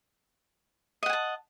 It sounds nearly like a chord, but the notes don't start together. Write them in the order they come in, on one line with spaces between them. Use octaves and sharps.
D#5 F#5 G#5 A5